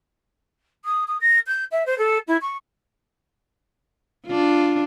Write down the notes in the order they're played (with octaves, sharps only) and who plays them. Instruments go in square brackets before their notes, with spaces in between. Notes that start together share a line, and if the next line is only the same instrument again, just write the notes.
[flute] D#6
D#6
A#6
G6
E5
C5
A4
E4
C#6
[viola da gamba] D4 F4